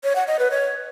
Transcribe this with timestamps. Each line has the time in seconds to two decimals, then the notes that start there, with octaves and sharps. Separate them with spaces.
0.04 C#5
0.15 F#5
0.27 D#5
0.39 B4
0.51 C#5